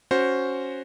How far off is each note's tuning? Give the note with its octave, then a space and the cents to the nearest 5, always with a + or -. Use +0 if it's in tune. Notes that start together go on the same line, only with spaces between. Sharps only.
C#4 +0 F#4 +0 C5 +0